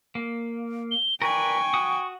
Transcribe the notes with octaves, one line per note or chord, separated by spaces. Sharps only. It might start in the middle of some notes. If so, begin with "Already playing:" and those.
A#3
G7
A#4 B4 D5 G5 G#5 C#6
F#4 F#5 D#6